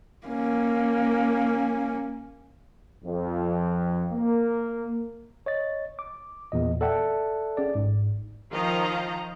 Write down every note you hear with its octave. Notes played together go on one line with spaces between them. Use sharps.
A#3 C#4
F2
A#3
C#5 D#5 A6
D6
E2 A#2 D#5
A4 D5 E5 F#5 G5 A5
C#4 G#4 D5
G#1 G#2
D#3 F3 D#4 D#5 F5 A#5